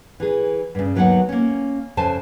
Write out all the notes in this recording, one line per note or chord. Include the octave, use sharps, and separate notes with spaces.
E3 G#4
G2 C#3
D#2 F#3 B3 D#4 F#5
A#3 C#4
F2 C#3 C5 G#5 A5